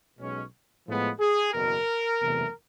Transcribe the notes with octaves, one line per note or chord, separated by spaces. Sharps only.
B1 B2 G#3 C#4
A2 F3 G#3 B3
G#4
F#1 E2 B2 A#4
F#1 E2 C3 E3 A3